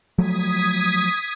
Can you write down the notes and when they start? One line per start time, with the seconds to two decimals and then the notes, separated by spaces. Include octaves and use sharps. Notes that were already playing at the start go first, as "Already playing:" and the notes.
0.18 F3 F#3 A3 D#6 G#6 B6